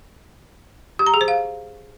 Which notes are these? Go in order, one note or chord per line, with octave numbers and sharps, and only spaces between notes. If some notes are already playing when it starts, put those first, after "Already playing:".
G4
A#5
G#4
C5
F5